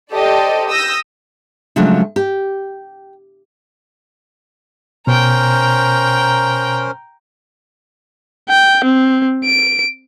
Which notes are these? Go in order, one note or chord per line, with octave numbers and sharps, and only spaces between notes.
G4 A4 C5 D5 D#5
D#6 E6 G6 A#6
C#3 F3 F#3 G#3 A3 D4
G4
B2 C#4 A#4 C5 G5 A#5
G5
C4
D7